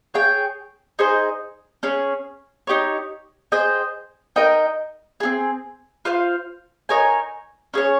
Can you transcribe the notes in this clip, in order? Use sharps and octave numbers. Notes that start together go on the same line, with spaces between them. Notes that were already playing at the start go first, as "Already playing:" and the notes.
G#4 C#5 G5
D#4 G#4 C5 D#5
C#4 G#4 C#5
D#4 G4 C#5
G#4 C5 D#5 G5
D#4 A#4 D#5 G5
C4 F4 G#4
F4 C5 F5
D#4 A#4 C#5 G#5
C#4 G#4 C#5